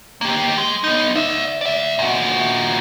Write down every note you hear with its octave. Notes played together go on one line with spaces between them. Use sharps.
A#3 G4
G#3
B3 D#4
D5 E5
D5 E5
A#2 F#4